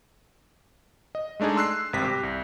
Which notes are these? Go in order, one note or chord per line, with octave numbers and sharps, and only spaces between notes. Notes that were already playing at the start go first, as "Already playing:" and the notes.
D#5
G#3 A3 D4 D#4 G#4
C6 E6 F#6 C7
G#1 G2 C3 A#6 B6
G4
C2